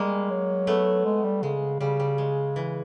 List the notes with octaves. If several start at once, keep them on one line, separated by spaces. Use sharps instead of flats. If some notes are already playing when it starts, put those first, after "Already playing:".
Already playing: G3 G#3 A#3
F#3
A3 B3
G#3
G3
C#3 G#3
C#3 G3
G3
G#3
E3